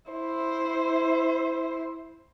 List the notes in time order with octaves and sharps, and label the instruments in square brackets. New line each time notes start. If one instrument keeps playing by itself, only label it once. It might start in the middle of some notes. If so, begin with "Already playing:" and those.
[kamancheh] E4 C5